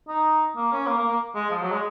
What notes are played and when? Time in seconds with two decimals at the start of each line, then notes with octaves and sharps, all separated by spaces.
0.08 D#4
0.56 A#3
0.72 C#4
0.87 A#3
0.98 A#3
1.08 A#3
1.35 G#3
1.51 F3
1.62 F#3
1.72 G#3